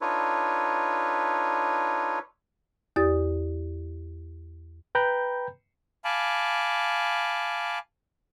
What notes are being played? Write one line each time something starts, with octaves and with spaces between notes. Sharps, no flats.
D4 D#4 F4 A4 B4 C#5
E2 G4 D5 D#6 A6
B4 G5 A#5 B5 G6
F5 G#5 A5 B5 D6